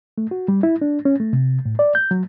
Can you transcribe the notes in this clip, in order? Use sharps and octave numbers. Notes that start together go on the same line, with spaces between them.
A3
F#4
G3
E4
D4
C#4
A3
C3
A2
D5
G6
F#3